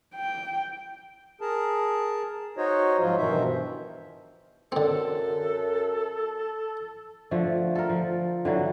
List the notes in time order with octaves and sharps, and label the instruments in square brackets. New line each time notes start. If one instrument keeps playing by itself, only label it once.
[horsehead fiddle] G5
[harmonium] G#4 A#4 A5
D#4 F#4 C5 C#5 D#5
G#2 F3 F#3 F4
G2 B2 D#3 E3 C5 E5
[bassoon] F#2 [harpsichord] D3 C4 [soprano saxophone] A4
[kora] D3 F3 A3
A4 A#4
F3
D3 E3 F#3